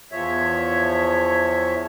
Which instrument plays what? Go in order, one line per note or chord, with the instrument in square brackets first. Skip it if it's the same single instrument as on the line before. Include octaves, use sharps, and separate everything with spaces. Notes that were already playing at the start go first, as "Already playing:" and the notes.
[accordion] E2 F3 C#5 E5